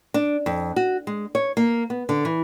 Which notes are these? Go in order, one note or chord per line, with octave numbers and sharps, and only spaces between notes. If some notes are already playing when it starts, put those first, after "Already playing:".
D4
F2
F#4
G#3
C#5
A#3
B3
D3
E3